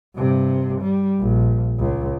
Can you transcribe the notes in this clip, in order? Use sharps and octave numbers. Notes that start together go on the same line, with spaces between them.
G2 C3
G3
A#1
C#2